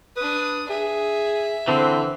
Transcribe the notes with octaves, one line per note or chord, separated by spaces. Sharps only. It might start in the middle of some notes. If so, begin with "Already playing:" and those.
D4 B4 D#6
G#4 E5
D3 E3 C4